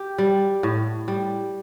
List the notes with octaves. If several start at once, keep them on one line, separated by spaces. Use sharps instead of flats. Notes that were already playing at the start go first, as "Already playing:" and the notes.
Already playing: G4
G3
A2
G3